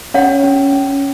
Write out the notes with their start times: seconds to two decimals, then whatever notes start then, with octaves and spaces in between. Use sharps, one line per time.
0.14 C#4 C#5 F#5
0.44 C#4
0.72 C#4